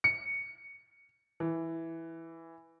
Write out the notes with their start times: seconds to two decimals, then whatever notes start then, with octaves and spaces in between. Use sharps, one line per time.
0.04 C#7
1.40 E3